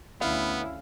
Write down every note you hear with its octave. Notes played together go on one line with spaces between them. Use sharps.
D2 B3 C#4 E4 F5